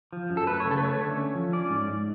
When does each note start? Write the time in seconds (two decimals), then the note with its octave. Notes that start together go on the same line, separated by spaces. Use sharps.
0.13 F3
0.30 F#2
0.37 A4
0.47 A3 B4
0.60 C#5
0.65 C#3
0.71 A4
0.78 B4
0.82 A3 C#5
1.01 D3
1.17 C#4
1.35 F3
1.52 C#4 D5
1.70 G#2
1.88 G#2